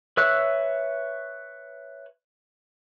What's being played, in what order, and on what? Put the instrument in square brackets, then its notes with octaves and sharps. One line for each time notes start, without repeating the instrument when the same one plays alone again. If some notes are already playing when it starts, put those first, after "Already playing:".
[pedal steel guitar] B4 C#5 E5 E6 F#6